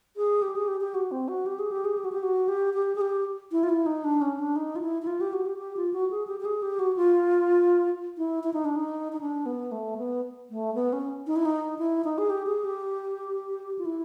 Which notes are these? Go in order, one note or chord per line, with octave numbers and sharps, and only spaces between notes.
G#4
G4
G#4
G4
G4
F#4
C4
F#4
G4
G#4
G4
G#4
G4
F#4
G4
F#4
G4
G4
G#4
G4
E4
F4
E4
D#4
D4
C#4
D4
D#4
F4
E4
E4
F4
G4
F#4
G4
G4
F4
F#4
G#4
G4
G4
G#4
G4
F#4
F4
E4
E4
D#4
D4
D#4
D#4
D4
B3
A3
B3
A3
B3
C#4
D#4
E4
D#4
E4
D#4
G#4
G4
G#4
G4
F4
E4